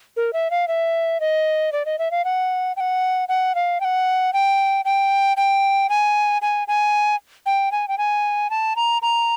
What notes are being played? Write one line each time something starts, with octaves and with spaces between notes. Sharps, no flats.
A#4
E5
F5
E5
D#5
D5
D#5
E5
F5
F#5
G5
F#5
F#5
F5
G5
F#5
G5
G5
G5
G#5
G#5
G#5
G5
G#5
G5
G#5
A5
A#5
A#5